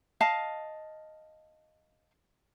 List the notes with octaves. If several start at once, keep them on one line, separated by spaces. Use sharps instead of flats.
D#5 F5 A5